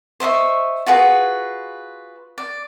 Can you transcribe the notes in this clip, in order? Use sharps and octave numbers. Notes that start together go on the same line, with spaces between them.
C5 D#5 E5 C#6
F4 F#4 G#4 B4
D5